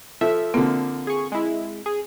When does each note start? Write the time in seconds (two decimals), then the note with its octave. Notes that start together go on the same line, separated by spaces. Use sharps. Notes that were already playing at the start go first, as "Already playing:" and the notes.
0.21 F3 A4 E5
0.54 D3 F3 A#3 C4
1.07 G#4 C#6
1.32 G#3 E4
1.86 G#4